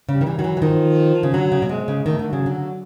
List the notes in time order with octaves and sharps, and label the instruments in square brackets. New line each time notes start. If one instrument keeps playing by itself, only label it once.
[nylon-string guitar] C#3
[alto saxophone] G3
[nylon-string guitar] D#3
E3
[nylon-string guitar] D#3 [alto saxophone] F#3
[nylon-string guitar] E3
E3
[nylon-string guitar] D#3 [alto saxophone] F3
[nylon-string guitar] C#3
[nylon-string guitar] D3 [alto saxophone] F#3
[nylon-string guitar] C#3
B2
[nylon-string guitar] C3 [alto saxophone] G#3
[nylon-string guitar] C#3
[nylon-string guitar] D#3 [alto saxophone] A3
[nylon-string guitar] D3
[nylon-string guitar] C#3 [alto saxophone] F#3
[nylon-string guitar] D3
[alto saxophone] F#3